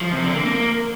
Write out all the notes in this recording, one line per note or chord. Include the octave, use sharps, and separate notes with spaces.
F3
C3
D3
A#3
A#3